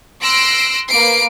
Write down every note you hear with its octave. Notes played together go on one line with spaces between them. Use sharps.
C6 E6 F#6 A#6 C7 D7
A#3 B4 C7 D7